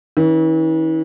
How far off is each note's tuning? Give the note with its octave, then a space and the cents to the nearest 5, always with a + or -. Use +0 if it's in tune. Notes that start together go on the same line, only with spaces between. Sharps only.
E3 -40 C#4 +0